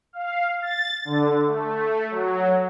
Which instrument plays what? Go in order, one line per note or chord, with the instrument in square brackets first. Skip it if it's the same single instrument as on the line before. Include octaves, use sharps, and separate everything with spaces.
[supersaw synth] F5
A6
D3
A3
F#3